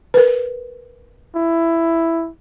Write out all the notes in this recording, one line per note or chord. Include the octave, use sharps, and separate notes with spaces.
A#4 B4
E4